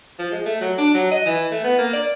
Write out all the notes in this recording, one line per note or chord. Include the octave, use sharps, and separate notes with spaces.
F3
G#3
A3
F#3
D4
F#3
D#5
E3
A3
B3
A#3
D5